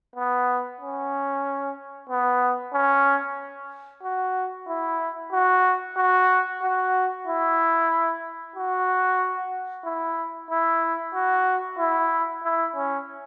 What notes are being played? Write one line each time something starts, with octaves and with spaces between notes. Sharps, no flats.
B3
C#4
B3
C#4
F#4
E4
F#4
F#4
F#4
E4
F#4
E4
E4
F#4
E4
E4
C#4